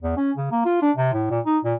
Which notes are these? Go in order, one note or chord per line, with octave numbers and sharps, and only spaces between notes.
E2
C#4
C#3
A#3
F4
D4
C3
A2
A#2
D#4
A#2